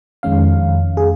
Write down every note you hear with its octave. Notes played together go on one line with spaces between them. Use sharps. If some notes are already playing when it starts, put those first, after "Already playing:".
F2 D#3 G#3 C#4 F5
G#4